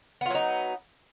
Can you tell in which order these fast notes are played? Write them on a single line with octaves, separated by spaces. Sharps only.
B3 F4 F#3 D#4